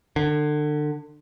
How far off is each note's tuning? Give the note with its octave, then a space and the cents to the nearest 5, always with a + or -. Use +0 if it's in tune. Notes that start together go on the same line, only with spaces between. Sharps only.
D3 +30